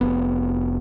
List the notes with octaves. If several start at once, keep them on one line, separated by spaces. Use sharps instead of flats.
F1 B3